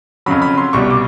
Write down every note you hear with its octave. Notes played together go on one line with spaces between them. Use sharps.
F2 C#3 F#3 B5
B5
C6
C2 B2 G3 C#6
D6